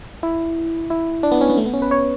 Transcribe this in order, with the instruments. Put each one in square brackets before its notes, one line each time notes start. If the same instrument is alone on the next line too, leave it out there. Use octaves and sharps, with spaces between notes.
[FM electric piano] E4
E4
D4
B3
C#4
B3
A3
B3
C#4
B4
C#5